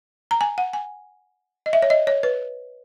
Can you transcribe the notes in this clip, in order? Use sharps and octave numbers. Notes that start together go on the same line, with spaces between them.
A#5
G#5
F#5
G#5
D#5
E5
C#5
D#5
C#5
B4